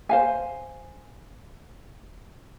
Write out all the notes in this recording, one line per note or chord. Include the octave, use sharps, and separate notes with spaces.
C5 F5 G#5